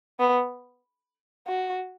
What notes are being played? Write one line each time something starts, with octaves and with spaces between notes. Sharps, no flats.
B3
F#4